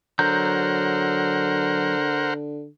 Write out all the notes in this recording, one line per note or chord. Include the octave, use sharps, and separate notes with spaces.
D3 F#3 A#4 C5 F#5 A#5 G6